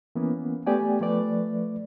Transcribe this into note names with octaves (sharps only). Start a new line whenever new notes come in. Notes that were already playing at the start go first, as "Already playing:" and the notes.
E3 A#3 B3 C#4
A3 B3 G4 D5 G5 G#5
F3 A3 B4 D5